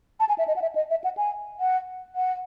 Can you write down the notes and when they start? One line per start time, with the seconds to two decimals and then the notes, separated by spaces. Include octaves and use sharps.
0.20 A5
0.29 G#5
0.38 E5
0.48 D#5
0.56 F#5
0.62 E5
0.75 D#5
0.90 E5
1.04 F#5
1.17 G#5
1.60 F#5
2.16 F#5